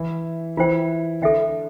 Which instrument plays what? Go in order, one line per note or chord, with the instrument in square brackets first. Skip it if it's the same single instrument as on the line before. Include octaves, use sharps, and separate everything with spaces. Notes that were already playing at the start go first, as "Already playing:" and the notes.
Already playing: [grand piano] E3 E4
[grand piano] E3 E4 [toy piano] F4 C5 G5
[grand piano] D3 D4 [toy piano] A4 E5 G5